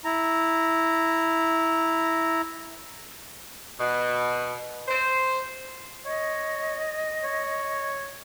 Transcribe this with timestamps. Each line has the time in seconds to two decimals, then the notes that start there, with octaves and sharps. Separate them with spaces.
0.05 E4 A#5
3.78 B2
4.88 C5
6.05 C#5 D#5
7.23 C#5